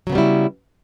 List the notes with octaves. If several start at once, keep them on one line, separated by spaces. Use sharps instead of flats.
C#3 F#3 G3 B3 E4